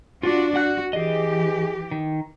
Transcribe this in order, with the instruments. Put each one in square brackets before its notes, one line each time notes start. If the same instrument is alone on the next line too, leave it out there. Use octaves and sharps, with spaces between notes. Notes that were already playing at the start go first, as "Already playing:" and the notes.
[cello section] D4 F#4 [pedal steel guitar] F4
[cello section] F#4 [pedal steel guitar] F#5 F#6
[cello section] E3 G4 [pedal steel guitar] G#4 D#5
[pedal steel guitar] D#3